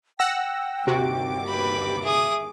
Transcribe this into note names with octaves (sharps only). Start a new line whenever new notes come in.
F#5 G5 E6 A#6
G1 D#2 C3 F#4 D6
G4 B4 B5
G#4 E5 D#6